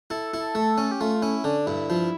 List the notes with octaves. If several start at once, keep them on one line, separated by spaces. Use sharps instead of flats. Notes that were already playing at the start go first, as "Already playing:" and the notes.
E4 A4
E4
A3
C#4
G4
A3 F4
F4
C#4 E4
D3 D4
G2 E4
F3 E4